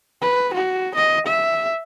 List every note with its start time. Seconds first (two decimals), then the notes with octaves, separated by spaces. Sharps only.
0.21 B4
0.54 F#4
0.95 D#5
1.26 E5